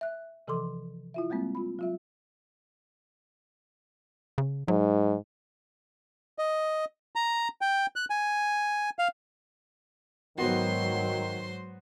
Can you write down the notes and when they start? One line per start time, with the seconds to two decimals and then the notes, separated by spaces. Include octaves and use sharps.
0.01 E5 F#6
0.48 C3 E3 F3 A4 C6 D6
1.14 E4 F4 E5
1.30 G3 G#3 A#3 C4
1.55 F4 B5
1.79 F#3 F4 E5
4.38 C#3
4.68 G#2 F#3
6.39 D#5
7.16 A#5
7.61 G5
7.96 F#6
8.10 G#5
8.99 F5
10.38 G#2 D#3 F#3 B3 F#4 C5 C6